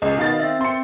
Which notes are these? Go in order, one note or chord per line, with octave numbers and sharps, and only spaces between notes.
C#2 G#4 D#5
B2 D#3 F5 A6
C4 E5
C4 C6 C#7